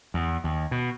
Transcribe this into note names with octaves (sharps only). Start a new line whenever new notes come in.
E2
D#2
B2